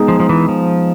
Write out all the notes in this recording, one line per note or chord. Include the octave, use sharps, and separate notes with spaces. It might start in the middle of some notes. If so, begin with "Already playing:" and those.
Already playing: G#3 B3 D#4 G#4
F3
F3
E3
F3